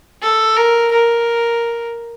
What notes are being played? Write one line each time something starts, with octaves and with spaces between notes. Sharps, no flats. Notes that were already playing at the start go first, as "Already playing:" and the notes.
A4
A#4
A#4